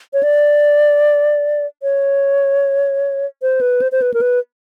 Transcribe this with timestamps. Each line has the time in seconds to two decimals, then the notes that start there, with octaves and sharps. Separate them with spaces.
0.13 C#5
0.23 D5
1.83 C#5
3.42 C5
3.61 B4
3.82 C5
3.92 C5
4.02 B4
4.14 A#4
4.21 B4